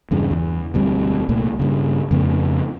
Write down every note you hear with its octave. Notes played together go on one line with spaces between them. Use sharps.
E2 G2 C#3
E2
E1 D2 G3 C4
C2 A#2 A3
G2 C#3
F2 C#3 A3 B3